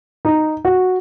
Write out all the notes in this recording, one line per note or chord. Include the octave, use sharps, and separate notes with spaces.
D#4
F#4